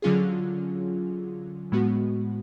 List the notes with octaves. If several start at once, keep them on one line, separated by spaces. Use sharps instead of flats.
D3 F#3 C#4 F4 G#4
A2 G#3 B3 F#4